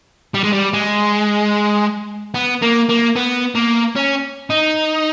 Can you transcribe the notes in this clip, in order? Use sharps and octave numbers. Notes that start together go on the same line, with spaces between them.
G3
G#3
G3
G#3
B3
A#3
A#3
B3
A#3
C#4
D#4